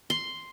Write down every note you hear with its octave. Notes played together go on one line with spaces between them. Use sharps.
C6